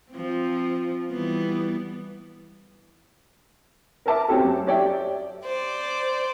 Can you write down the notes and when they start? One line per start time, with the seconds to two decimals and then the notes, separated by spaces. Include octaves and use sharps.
0.12 F3 C4
1.11 E3 G3 B3
4.06 A#4 B4 E5 A5 D6
4.28 C4 C#4 F#4 G4 A4
4.44 F#2
4.67 G4 C#5 D5 E5 G5
5.45 C5 D5